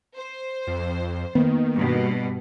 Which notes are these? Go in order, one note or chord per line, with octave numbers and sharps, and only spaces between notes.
C5
F2
D#3 A#3 B3
G2 B2